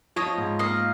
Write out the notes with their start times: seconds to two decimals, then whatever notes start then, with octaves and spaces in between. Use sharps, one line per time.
0.16 F3 C#5 D#5
0.37 G#2
0.59 A#3 D#5 F5